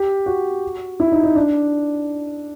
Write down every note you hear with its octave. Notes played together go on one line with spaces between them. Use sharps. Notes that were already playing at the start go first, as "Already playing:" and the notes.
Already playing: G4
F#4
E4
D#4
D#4
D4